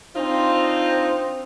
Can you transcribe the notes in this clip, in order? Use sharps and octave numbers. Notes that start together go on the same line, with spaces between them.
C4 D4 D#4 F4 C5